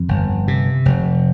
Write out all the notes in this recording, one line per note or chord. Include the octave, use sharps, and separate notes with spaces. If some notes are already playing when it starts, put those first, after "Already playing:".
Already playing: F2
G1
C3
F1